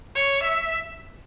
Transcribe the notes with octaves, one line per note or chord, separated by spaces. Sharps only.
C#5
E5